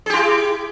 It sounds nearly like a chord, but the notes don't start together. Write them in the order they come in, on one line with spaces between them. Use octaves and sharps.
G#4 G4 E4